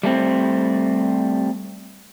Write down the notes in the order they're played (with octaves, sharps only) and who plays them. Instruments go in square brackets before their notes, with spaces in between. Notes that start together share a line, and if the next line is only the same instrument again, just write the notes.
[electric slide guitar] G3 A3 C4